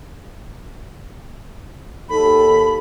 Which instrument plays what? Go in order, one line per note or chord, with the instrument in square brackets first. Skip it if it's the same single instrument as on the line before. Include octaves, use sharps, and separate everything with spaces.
[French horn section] D#2 A4 [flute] B5